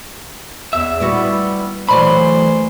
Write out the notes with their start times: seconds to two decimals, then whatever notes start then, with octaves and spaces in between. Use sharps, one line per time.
0.73 E2 E5
1.00 G3 B3 E4 F#4
1.89 E2 E3 F#3 A3 C5 D5 B5